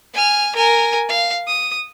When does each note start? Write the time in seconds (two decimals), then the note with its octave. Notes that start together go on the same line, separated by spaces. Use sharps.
0.13 G#5 F6
0.55 A#4 G#5
1.09 F5
1.47 D#6